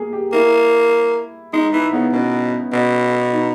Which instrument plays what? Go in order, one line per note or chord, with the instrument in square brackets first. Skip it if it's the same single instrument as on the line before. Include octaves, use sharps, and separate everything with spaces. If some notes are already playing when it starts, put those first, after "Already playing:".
Already playing: [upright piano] A#3 G#4
G4
[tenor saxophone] A#3 [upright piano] E4
[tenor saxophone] G#3 [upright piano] D#4
[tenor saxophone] E3 [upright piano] E4
[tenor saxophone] C#3 [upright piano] B3
[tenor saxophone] B2 [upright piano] C#4
[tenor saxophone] B2
[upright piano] D#4